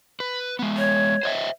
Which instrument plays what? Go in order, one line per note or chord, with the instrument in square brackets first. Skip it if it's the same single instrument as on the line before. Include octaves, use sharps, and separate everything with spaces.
[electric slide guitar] B4
G#3 B3
[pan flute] C#5
[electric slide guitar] C5 D#5 E5